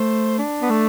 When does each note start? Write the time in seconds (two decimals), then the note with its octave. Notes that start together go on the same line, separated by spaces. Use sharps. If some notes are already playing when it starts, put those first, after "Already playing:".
Already playing: A3 C5
0.38 D4
0.62 B3
0.70 A3